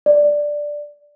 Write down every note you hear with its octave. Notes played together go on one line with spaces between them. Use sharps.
D5